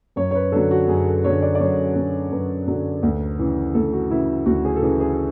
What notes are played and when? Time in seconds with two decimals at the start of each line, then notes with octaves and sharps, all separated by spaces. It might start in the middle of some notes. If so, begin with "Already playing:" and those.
0.16 F#2 C#5
0.31 C#5
0.35 B4
0.52 D3 F#3 A4
0.71 F#4
0.88 F#2 G#4
1.06 A4
1.24 D3 F#3 C#5
1.42 D5
1.55 D5
1.60 F#2 C#5
1.96 D3 F#3
2.32 F#2 B4
2.68 D3 F#3
3.03 D2
3.39 C#3 E3
3.74 D2 A4
3.93 F#4
4.10 C#3 E3 E4
4.46 D2 F#4
4.65 G#4
4.76 A4
4.82 C#3 E3 G#4
5.00 G#4